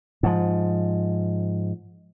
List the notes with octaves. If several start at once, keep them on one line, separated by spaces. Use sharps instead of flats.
G#2 F3